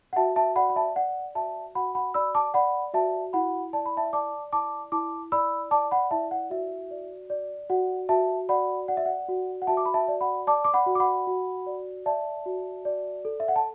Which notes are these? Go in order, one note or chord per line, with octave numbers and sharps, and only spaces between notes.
F#5
F#4 E5 A5
E5 A5
D5 F#5 B5
B5
E5 A5
D5 F#5
F#4 E5 A5
F#4 F#5 B5
F#5 B5
D5 B5 E6
A5 D6
D5 F#5 B5
F#4 E5 A5
E4 F#5 B5
D5 A5
B5
E5 A5
D5 A5 D6
E4 A5 D6
E4 A5 D6
D5 B5 E6
D5 A5 D6
F#5 B5
E4 E5 A5
F#5
F#4 E5
D5
D5
F#4 F#5
F#4 E5 A5
D5 F#5 B5
D5 F#5
E5
F#5
F#4
F#5
F#4 E5 A5
D6
B5
E5 A5
D5
F#5 B5
D5 A5 D6
D6
F#5 B5
F#4
D6
F#5 B5
F#4
D5
D5 E5 A5
F#4
D5
A4
E5
F#5
A5